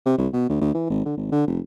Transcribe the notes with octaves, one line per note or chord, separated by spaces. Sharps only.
C3
C2
B2
D2
D2
E3
G#1
D3
G#1
D3
F1